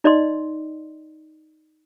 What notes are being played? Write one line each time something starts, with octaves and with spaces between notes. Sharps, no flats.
D#4 D5 D#5 C6